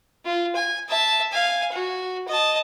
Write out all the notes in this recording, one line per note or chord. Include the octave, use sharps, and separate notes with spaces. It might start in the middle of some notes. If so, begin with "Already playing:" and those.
F4
G#5
E5 A5
F5 G#5
F#4
D#5 A5